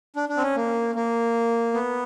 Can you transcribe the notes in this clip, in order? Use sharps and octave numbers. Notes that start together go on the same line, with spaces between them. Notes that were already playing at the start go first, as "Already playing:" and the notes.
D4
D4
C4
C#4
A#3
A#3
B3